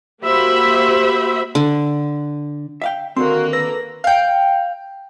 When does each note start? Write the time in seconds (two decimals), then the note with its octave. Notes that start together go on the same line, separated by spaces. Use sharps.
0.23 A#3 F#4 G4 C5 E5 B5
1.55 D3
2.82 E5 F5 G5
3.16 D#2 D3 A#3 C4 F#4 C6
3.53 A4 B4 E6 A#6
4.04 F5 G5